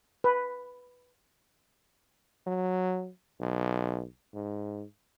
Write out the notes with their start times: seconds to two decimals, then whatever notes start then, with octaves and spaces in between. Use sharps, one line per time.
0.24 B4
2.47 F#3
3.40 B1
4.34 G#2